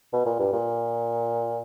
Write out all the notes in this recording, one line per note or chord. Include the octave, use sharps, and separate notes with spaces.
B2
A#2
G2
A#2